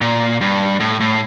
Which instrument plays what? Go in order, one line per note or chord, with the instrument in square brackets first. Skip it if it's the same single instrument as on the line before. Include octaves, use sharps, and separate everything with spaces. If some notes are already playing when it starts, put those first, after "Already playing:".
[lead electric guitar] A#2
G2
A2
A2